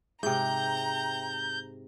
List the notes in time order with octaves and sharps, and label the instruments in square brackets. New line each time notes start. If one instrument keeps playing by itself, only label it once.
[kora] G#2 C3 [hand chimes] E5 G5 [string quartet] A#5 [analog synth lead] G6